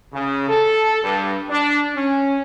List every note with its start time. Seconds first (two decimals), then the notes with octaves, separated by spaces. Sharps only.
0.13 C#3
0.48 A4
1.04 G2
1.49 D4
1.96 C#4